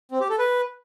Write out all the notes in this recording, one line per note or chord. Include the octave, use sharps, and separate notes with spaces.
C4
G4
A4
B4